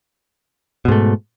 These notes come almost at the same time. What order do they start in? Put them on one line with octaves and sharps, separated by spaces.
B2 G#2 A3